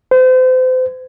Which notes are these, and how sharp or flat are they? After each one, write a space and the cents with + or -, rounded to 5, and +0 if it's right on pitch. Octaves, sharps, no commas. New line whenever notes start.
C5 -35